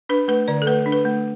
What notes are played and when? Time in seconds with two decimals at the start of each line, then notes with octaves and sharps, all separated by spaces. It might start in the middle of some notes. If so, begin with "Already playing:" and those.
0.09 D4 B4
0.28 A3 B4
0.48 D3 D5
0.62 A4
0.67 A3 B4
0.86 D4
0.92 B4
1.05 A3